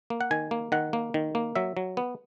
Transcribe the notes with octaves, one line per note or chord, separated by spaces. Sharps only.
A#3
F#5
D#3 G#5
A#3
D#3 F#5
A#3
D#3
A#3
F#3 E5
F#3
B3